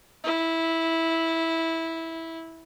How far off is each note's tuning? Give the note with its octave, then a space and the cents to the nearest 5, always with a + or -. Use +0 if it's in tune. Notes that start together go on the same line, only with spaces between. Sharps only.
E4 -10